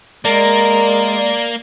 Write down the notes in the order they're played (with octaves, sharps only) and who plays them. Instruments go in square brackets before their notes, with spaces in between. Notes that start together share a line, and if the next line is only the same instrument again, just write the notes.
[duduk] G#3 [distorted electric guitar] A#3 [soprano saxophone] A#4 [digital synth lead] D5